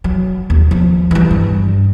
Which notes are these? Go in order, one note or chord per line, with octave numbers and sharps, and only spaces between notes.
F#3
D#2
F3
E3 G3
G2